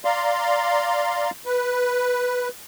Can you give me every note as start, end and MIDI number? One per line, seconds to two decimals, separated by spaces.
0.05 1.30 74
0.05 1.30 77
0.05 1.30 82
0.05 1.30 84
1.46 2.49 71